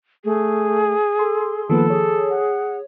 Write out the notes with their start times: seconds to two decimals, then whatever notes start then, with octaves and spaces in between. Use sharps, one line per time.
0.25 A3 G#4
1.19 A4 C6
1.70 D#3 F3 A#3 B3 A4
1.90 G#4 C#5
2.30 F#5